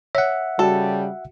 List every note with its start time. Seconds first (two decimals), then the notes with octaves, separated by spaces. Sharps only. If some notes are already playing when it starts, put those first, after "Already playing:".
0.15 C#5 E5 F#5
0.59 C#3 G3 F#4 A4